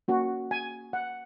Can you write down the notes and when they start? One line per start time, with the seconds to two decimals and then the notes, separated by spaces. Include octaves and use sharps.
0.08 A#3 C#4 F#4
0.51 G#5
0.93 F#5